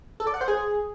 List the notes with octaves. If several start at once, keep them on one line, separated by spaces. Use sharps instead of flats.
A4
D5
F#5
C5
G#4